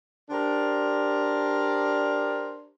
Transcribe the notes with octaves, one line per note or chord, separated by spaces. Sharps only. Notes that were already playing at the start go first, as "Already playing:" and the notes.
D4 G4 A#4 C5 D5